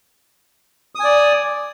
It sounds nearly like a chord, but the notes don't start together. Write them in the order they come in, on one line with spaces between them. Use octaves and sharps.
D#6 G#5 D5